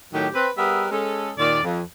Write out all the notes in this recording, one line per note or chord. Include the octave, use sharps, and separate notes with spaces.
A2 D#3 F#3 G4
C4 B4
G3 B3 G#4 A#4 B4 E5
G#3 C#4 G#4 A4
D#2 A#2 D#3 D5
F2